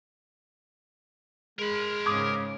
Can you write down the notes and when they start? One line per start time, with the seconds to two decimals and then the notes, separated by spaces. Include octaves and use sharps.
1.59 G#3 A#4 B5
2.06 G#2 C#3 D6 D#6 G#6